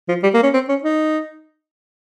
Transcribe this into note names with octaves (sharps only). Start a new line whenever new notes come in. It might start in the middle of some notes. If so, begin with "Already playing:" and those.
F3
G3
A#3
C#4
C4
C#4
D#4